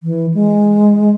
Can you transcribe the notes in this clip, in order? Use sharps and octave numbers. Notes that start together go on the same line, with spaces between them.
E3
G#3